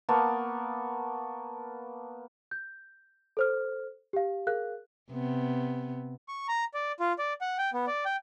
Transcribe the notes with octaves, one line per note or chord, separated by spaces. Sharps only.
A#3 B3 C#5 A5
G6
A4 C5 F6
G4 F5
G#4 A#4 F5 F#6
C3 B3
C#6
A#5
D5
F4
D5
F#5
G5
B3
D5
G5